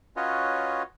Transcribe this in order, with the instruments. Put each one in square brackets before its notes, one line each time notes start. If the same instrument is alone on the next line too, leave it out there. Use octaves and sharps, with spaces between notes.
[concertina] C#4 F4 F#4 B4 C#5 D#5